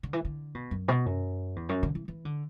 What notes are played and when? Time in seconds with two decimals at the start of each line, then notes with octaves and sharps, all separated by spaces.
0.03 D3
0.13 E3
0.25 D3
0.55 B2
0.71 F#2
0.88 B2
1.06 F#2
1.56 E2
1.69 F#2
1.83 D3
1.95 E3
2.08 E3
2.25 D3